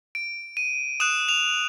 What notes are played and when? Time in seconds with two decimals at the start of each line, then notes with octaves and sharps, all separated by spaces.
0.15 D7
0.57 D#7
1.00 D#6 F#6 E7
1.28 F7